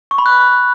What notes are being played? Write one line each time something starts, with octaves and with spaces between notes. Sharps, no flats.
C#6
B5
F#6